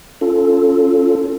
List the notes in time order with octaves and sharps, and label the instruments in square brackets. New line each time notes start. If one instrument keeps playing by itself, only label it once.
[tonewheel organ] C#4 F4 A4